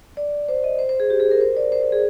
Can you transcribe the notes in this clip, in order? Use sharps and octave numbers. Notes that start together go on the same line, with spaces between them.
D5
C5
D#5
C5
C5
G#4
G4
G#4
A#4
C5
D5
C5
C5
G#4